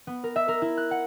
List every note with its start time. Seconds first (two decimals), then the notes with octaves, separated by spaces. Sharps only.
0.07 B3
0.24 A#4
0.36 E5
0.48 A#4
0.62 E4
0.77 F#6
0.91 F#5